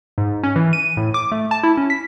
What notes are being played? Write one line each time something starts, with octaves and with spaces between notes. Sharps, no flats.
G#2
C#4
E3
D#7
A2
D6
A3
A5
E4
C#4
B6